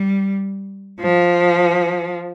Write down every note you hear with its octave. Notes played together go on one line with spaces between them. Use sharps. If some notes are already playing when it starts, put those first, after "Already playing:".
Already playing: G3
F3